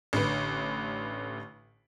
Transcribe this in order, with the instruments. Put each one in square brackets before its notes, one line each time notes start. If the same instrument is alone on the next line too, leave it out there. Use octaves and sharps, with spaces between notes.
[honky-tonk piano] A1 D3 B4